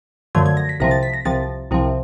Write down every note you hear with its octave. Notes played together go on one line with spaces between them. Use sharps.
F#2 D3 F3 A3 G#6
G#6
A#6
B6
C2 C3 F3 A#6
A6
B6
A#6
C2 C3 F3 A6
C2 C3 F3